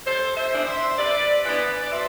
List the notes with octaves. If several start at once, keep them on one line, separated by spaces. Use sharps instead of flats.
C3 A4 C5
C5 E5
E3 B3 D4
C5 E5
C3 B4 D5
E3 B3 D4 B4 D5
D5
B2 C5 E5